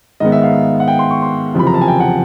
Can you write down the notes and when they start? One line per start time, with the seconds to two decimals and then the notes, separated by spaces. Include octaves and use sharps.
0.20 G#2 D#3 G#3 B3 D#5
0.32 E5
0.43 F5
0.80 F#5
0.88 G5
0.99 C6
1.11 C#6
1.22 C6
1.54 F#1 E2 C3 F3 B5
1.67 A#5
1.74 A5
1.81 G#5
1.88 G5
2.00 F#5